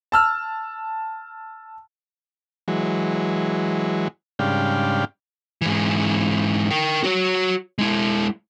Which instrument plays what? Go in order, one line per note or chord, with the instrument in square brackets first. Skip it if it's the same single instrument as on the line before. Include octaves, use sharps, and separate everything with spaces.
[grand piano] A5 E6 F6
[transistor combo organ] E3 F#3 G#3
G#2 C#3 G3 D4 F5 G5
[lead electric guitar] G#2 E3
A#4 G5
F#4 C#5
G#3 E4